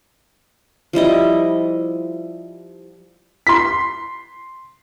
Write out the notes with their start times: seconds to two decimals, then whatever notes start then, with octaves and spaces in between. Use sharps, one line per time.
0.93 F3 G3 E4 D#5
3.47 C6 B6